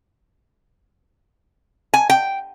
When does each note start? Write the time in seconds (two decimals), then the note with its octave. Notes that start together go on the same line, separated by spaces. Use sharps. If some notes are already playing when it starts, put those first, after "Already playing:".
1.94 G#5
2.10 G5